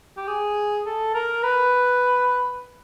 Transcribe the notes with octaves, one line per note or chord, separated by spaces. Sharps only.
G4
G#4
A4
A#4
B4